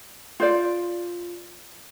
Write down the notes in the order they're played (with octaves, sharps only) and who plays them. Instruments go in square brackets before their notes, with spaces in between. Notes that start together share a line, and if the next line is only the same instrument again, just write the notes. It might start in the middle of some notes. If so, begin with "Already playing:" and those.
[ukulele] F4 C5 D5